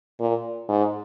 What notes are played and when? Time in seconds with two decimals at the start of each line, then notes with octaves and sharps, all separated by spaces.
0.20 A#2
0.69 G#2